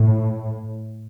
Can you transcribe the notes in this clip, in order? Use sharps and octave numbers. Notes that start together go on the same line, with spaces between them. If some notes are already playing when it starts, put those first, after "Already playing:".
Already playing: A2